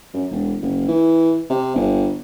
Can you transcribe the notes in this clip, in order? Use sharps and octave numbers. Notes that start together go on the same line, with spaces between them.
F#2
E1
F#1
E3
C3
G1